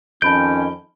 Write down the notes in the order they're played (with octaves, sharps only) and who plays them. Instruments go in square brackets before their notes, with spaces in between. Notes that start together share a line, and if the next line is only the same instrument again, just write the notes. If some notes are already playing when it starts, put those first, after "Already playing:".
[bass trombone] F2 [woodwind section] D#3 C#4 [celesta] A5 B5 D7 [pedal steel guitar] G6